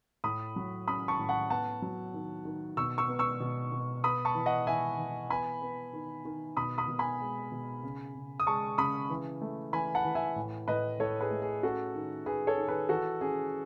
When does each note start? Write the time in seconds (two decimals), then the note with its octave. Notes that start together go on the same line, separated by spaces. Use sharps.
0.24 A2 B5 D#6
0.56 F#3
0.87 C#4 B5 D#6
1.08 A5 C#6
1.19 A2
1.29 F#5 A5
1.50 B3 F#5 A5
1.82 F#3
2.14 D#3
2.45 D#3
2.77 B2 C#6 E6
2.98 C#6 E6
3.08 B3
3.19 C#6 E6
3.40 B2
3.72 B2
4.04 B3 B5 D#6
4.25 A5 C#6
4.35 E3
4.46 D#5 F#5
4.67 E3 E5 G#5
4.98 E3
5.30 B3 G#5 B5
5.62 B3
5.93 D#3
6.25 D#3
6.57 B2 B5 D#6
6.78 B5 D#6
6.88 B2
6.99 G#5 B5
7.21 G#3
7.52 B2
7.83 C#3
8.15 C#3
8.40 D#6
8.46 G#3 A5 C#6
8.78 C#3 B5 D#6
9.10 E3
9.42 A3
9.73 E3 G#5 B5
9.95 F#5 A5
10.05 E3
10.15 E5 G#5
10.36 A2
10.68 A2 B4 D#5
11.00 A2 A4 C#5
11.21 G#4 B4
11.31 A3
11.42 G#4
11.63 C#4 F#4 A4
11.95 D#3
12.26 D#3 G#4 B4
12.47 A4 C#5
12.58 D#3
12.68 G#4 B4
12.89 E3 F#4 A4
13.21 C#4 G#4